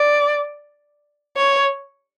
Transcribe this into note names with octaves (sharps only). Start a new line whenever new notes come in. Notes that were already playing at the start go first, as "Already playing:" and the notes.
Already playing: D5
C#5